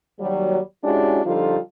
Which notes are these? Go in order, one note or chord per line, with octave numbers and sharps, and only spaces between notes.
D#2 F#3 G3
G#3 C#4 D4 E4 F#4 G4
D3 F3 G3 D#4 F4 A4